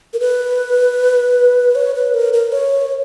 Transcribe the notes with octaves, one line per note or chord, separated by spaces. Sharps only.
A#4
B4
C#5
B4
A#4
A#4
C#5